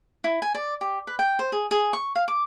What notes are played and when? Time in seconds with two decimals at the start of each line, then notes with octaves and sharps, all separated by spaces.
0.24 E4
0.42 G#5
0.55 D5
0.81 G4
1.07 B4
1.19 G5
1.39 C5
1.52 G#4
1.71 G#4
1.93 C#6
2.16 F5
2.28 D6